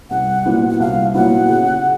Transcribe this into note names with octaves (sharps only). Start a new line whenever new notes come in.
C2 F#5
A#2 F#3 B3 E4
F#5
C2 F5
A#2 F#3 B3 E4 F#5
C#3